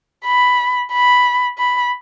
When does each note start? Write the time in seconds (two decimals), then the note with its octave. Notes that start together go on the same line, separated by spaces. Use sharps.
0.25 B5
0.93 B5
1.59 B5